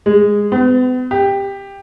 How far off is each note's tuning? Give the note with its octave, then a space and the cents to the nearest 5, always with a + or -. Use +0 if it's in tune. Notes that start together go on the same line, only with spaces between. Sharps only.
G#3 -15
B3 +40
G4 +10